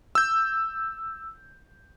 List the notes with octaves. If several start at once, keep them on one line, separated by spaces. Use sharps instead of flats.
E6 G6